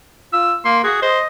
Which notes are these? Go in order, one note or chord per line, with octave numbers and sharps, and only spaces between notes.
F4 E6
A#3 C6
F#4 G#4
C5 D#5